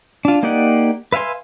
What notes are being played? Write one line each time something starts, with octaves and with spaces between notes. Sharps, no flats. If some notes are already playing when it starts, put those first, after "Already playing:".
D4 F4
A#3 D#4 G4 D5 F#5
B4 E5 F5 G#5 C6